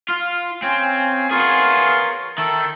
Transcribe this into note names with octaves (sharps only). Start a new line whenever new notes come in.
F4 F5
C4 C#4 F4 G#5
B3 F4 G#4 A#4 C#5
D#3 A4 E5 A5